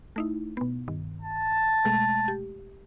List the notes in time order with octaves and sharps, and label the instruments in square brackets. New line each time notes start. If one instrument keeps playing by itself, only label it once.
[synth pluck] A3 D#4 E4
B2 B3
G2 D#3
[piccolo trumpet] A5
[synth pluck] B2 G#3 A3
G4